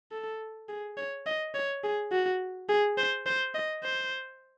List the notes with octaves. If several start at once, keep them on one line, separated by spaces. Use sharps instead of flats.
A4
G#4
C#5
D#5
C#5
G#4
F#4
G#4
C5
C5
D#5
C5